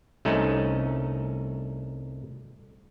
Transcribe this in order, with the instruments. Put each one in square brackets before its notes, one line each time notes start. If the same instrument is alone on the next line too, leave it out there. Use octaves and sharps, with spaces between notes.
[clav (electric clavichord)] C2 A3 C#4 D#4